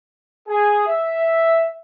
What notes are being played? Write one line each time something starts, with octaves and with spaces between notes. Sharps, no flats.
G#4
E5